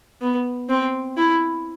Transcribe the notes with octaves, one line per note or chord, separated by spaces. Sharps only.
B3
C4
E4